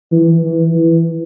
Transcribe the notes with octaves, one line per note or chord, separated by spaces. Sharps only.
E3
E3
E3